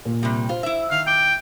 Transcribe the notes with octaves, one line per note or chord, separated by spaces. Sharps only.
A#2
C3 G3
F4 C5
E4 E5
D#3 F5
G5 D6